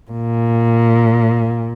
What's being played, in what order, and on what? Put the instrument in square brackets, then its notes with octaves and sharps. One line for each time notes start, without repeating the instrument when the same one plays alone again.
[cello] A#2